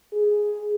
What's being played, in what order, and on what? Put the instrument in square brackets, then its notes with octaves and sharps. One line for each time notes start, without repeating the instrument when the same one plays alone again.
[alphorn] G#4